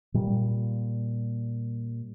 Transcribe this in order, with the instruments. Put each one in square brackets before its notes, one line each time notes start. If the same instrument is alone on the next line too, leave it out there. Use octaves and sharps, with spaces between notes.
[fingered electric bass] A#2 G3